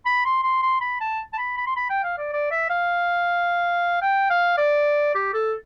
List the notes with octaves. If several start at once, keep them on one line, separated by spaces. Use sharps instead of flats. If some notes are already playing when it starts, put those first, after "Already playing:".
B5
C6
C6
C6
B5
A5
A5
B5
B5
C6
B5
G5
F5
D5
D5
E5
F5
G5
F5
D5
G4
A4